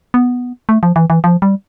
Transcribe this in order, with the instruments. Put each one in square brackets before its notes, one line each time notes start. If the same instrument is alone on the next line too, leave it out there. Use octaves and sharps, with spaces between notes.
[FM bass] B3
A3
F3
E3
E3
F3
G3